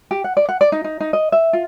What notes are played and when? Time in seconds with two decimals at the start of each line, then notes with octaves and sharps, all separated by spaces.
0.11 G4
0.24 F#5
0.37 D5
0.49 F#5
0.61 D5
0.72 D#4
0.84 D#4
1.00 D#4
1.13 D#5
1.32 E5
1.53 F4